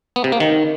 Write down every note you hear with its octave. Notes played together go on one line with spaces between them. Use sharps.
B3
C3
A#3
D#3